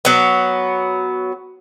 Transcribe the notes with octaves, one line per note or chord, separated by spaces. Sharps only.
F#3 B3